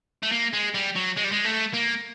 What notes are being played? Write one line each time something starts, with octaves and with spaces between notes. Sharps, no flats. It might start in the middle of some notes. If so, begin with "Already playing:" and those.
A3
A#3
G#3
G3
F#3
G#3
G3
G#3
A3
A#3